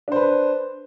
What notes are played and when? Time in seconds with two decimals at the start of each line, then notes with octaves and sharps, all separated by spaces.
0.08 D4
0.12 C5
0.16 B4